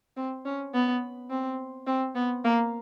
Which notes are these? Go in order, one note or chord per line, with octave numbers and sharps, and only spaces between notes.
C4
C#4
B3
C4
C4
B3
A#3